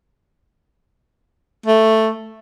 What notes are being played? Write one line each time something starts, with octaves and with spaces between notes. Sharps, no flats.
A3